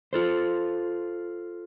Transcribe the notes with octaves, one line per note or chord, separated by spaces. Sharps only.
F4 A4 C5